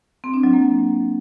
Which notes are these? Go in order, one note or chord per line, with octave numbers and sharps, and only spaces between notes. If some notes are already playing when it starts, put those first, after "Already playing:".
C4
D4
F#3
A#3